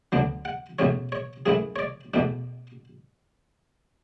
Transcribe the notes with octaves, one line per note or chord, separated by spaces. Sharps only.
D2 D3 F#3 B3 D4
F#5
E2 B2 A3 C#4 C#5
C#5
F#2 E3 A3 E4 G#4
C#5
D5
E2 B2 A3 D4